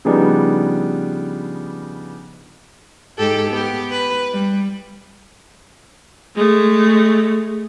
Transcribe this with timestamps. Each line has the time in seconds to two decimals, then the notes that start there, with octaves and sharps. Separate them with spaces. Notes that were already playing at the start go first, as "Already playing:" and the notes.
0.05 C#3 F3 G3 B3 D4 D#4
3.18 G#2 G4 A4
3.50 B3 G4
3.91 B4
4.33 G3
6.35 G#3 A3